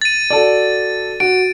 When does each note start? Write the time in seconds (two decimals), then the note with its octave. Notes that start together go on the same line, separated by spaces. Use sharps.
0.01 A6 D#7
0.30 F#4 A4 D5
1.20 F#4 D7